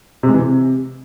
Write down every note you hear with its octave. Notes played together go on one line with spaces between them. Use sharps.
C3
G#3
E3
C3